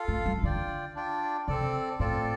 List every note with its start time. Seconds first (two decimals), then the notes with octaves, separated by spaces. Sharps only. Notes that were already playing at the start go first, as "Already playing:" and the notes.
Already playing: F4 A4 F5
0.08 A3
0.26 G3
0.43 D3 F4 D5 G5
0.95 D4 F4 D5 G5
1.48 C3 C4 A4 D5
2.00 A2 C4 F4 A4 D5